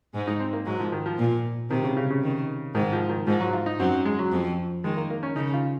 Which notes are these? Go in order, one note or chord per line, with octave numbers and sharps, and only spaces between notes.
G#2 G#3
D#4
C4
A#3
G#2 F#3 G#3
F3
D#3
F3
A#2
C3 D#3
C#3
C#3
C#3
D#3
G#2 D#3 G#3
F3
D#3
G#2 F3 G#3
F#3
F4
D#4
F#2 F#3 C4
G#3
F#3
F2 F3
D#3 G#3
A#3
A#3
C#4
C#3 D#4
F4